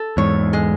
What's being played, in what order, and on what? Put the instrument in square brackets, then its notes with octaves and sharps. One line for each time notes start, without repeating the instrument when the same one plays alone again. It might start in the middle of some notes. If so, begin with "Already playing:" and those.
Already playing: [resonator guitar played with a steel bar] A4
[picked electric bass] E2 G#2 [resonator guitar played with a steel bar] C#5
[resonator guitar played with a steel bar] G#3